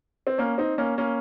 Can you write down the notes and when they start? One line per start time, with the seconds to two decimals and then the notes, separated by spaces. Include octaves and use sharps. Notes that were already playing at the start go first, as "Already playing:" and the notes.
0.27 C4
0.38 A#3 C#4
0.58 C4 D#4
0.78 A#3 C#4
0.98 A#3 C#4